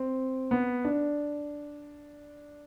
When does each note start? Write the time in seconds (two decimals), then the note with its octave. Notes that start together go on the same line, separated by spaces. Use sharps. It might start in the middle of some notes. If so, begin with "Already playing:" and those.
Already playing: C4
0.51 B3
0.85 D4